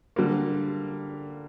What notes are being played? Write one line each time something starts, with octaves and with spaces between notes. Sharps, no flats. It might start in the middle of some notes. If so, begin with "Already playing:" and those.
D3 G3 A#3